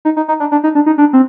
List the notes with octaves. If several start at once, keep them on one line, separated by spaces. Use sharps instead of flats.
D#4
D#4
D#4
D4
D4
D#4
D4
D#4
D4
C4